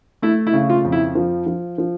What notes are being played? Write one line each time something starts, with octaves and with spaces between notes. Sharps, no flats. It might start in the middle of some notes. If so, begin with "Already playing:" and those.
A3 E4
E4
C#3
F4
F2
E4
F3
F3
F3